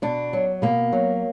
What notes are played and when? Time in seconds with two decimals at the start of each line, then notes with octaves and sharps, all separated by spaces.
0.02 B2 D4
0.33 F#3
0.62 B2 A#3
0.92 F#3